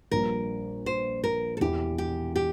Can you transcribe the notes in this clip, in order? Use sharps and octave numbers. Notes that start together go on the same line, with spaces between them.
A#1 A#2 G3 A#4
C5
A#4
A4
E1 E2 E3 G4
G4
G4